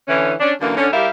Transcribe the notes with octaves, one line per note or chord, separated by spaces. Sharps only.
D3 E3 C#4
C#4 D4
F#2 D3 E3 A#3
D3 C#4
G3 E4 G4 A#4 E5 F5